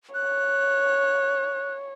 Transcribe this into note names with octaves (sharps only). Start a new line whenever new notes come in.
C#5 F#6